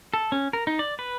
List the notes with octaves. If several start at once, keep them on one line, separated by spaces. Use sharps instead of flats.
A4
C#4
A#4
D#4
D5
B4